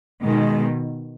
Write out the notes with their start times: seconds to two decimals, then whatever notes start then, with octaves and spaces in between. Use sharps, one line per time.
0.23 B2 D#3 G#3